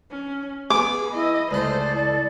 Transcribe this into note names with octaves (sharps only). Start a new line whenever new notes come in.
C#4
B3 G#4 G#5 B5 D6
E4 D#5
C#2 A3 C5 D5 D#5
E4 A4